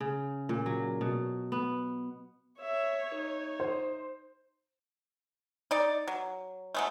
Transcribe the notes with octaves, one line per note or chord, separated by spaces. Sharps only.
C#3
A#2
F#3
B2
B3
C#5 E5
D#4
C5
D#4 D5
F#3
F#3 G#3 A3